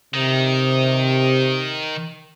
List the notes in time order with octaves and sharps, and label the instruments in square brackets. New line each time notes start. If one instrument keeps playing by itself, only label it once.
[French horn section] C3 [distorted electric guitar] D#3